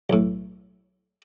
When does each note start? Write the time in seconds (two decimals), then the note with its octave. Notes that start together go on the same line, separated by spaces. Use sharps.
0.10 B1 A2